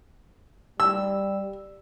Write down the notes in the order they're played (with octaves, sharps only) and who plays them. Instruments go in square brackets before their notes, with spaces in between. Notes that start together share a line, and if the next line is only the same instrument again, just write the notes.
[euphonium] G3 [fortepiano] E6